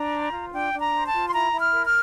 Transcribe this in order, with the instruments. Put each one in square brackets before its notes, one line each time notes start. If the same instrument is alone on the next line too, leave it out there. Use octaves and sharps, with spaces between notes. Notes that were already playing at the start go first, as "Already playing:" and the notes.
Already playing: [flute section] D4 A#5
C5
F4
D4 G5
D4
A#5
C5
A5
F4
C6
E4 A#5
E4
F6
A#4
F6